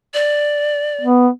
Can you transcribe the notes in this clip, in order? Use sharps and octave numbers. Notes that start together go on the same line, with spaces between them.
D5
B3